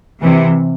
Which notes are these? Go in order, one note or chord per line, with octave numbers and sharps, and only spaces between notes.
C3 E3